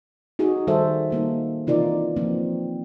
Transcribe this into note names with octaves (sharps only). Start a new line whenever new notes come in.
D#4 F#4 G#4
D#3 G3 A4 C5 E5
G3 A#3 D#4
C3 E3 D#4 F4 A#4 D5
F3 A#3 C4